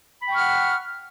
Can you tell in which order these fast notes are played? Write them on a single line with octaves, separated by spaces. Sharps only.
B5 G5 C#6 F6 F#5